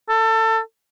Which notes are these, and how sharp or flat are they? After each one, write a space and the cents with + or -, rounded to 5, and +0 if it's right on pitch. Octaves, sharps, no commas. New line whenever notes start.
A4 +25